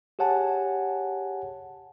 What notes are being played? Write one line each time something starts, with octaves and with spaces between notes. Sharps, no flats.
G4 G#4 C#5 F#5 G#5 A5